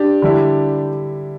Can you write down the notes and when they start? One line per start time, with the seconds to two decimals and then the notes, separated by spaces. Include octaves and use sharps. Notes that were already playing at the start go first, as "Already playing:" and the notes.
Already playing: D4 G4
0.22 D3 G3 E4